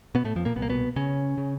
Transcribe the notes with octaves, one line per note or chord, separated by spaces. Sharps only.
B2 B3
A2 A3
F2 F3
A#2 A#3
C2 A#2 B3
A#3
B2 B3
C#3 C#4
C#3